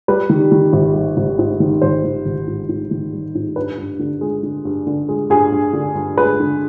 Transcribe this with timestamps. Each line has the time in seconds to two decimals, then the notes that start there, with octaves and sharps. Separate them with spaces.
0.08 G3 B4
0.30 D#3
0.52 D#3
0.73 G#1
0.95 G3
1.17 G#1
1.39 G#2
1.60 D#3
1.82 G#1 C5
2.04 D#3
2.25 G#1
2.47 G#2
2.69 G#2
2.91 D#3
3.13 G3
3.35 G#2
3.56 G2 B4
3.78 G2
3.99 D3
4.21 G#3
4.43 D3
4.65 G2
4.87 D3
5.09 G#3
5.30 G2 G#4
5.52 G2
5.73 D3
5.95 G2
6.18 G#3 B4
6.40 D3